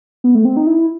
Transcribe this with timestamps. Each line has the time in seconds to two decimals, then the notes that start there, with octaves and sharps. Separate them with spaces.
0.24 B3
0.35 A3
0.45 C4
0.57 D#4
0.67 E4